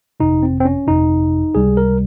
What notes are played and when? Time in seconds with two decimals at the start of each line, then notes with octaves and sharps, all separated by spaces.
0.20 G1 F2 C3 D#4
0.43 C4
0.60 C4
0.65 C#4
0.87 G1 F2 C3 D#4
1.55 C#2 C3 G3 G#4
1.77 A#4